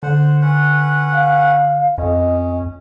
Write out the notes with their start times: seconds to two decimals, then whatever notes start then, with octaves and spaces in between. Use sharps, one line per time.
0.03 D3 C5 F#5
0.42 C#4 B4 F#5
1.12 F5
1.98 F2 C#4 D#5